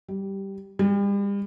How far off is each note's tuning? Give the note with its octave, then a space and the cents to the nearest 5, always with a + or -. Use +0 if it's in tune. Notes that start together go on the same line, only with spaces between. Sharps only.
G3 -5
G3 +40